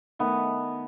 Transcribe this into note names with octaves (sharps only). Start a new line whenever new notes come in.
D#3 A3 B3